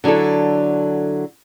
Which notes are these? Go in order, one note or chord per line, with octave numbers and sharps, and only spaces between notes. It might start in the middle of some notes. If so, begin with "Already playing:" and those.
D3 F#3 D4 E4 A4